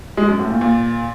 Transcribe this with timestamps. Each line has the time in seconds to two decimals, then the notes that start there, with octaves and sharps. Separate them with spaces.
0.17 G#3
0.28 F#2
0.39 A2
0.50 A#2
0.61 A#2